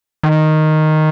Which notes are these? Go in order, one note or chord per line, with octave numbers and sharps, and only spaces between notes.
D#3